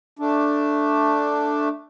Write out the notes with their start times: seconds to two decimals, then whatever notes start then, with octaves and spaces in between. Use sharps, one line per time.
0.19 A3 D4